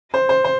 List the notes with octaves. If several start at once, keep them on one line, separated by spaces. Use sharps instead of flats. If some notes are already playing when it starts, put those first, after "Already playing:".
C5
C5
C5